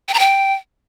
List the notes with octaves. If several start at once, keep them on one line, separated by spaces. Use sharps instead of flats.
G5
A#5
G5